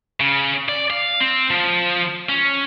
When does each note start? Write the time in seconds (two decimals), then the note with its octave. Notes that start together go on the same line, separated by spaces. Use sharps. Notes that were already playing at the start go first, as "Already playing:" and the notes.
0.20 C#3
0.69 D5
0.90 F5
1.20 C4
1.50 F3
2.29 C#4